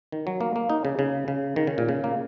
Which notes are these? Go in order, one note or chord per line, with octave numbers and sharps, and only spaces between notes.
D#3
F#3
A#3
A#3
D#4
C#3
C#3
C#3
D#3
C#3
A#2
C#3
A#3